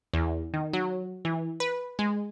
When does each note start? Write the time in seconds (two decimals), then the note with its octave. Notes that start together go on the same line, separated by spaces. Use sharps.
0.14 E2
0.54 D#3
0.73 F#3
1.25 E3
1.60 B4
1.99 G#3